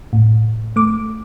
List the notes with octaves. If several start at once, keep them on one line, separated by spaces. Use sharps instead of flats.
A2
A3 D6